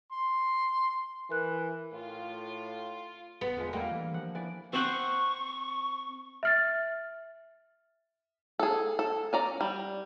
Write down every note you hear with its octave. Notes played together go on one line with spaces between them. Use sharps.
C6
E3 A#4 F#6
A2 F4
F1 B3
E2 D3 F3 G#3
G2 G3 A3 A#3
E3
F3 F#5
E3 D5
C4 C5 F#5 C#6
E5 F6 A6
G#4 A4
A4
C#4 D5 A#5
G3